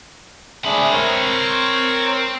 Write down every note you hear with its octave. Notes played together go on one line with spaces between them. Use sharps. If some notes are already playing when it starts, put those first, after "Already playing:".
A3 C4 D4 G#4 B5
A#4 C#5 C#6